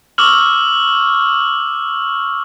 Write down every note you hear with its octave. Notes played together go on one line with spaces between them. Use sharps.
C#6 D6 E6 F6 F#7